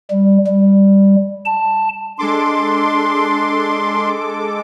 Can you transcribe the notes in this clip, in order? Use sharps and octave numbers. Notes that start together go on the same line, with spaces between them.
G3
G3
A5
G#3 D4 A4 C6 D6